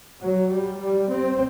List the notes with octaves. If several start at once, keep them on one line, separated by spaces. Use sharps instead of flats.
F#3
G3
G3
C4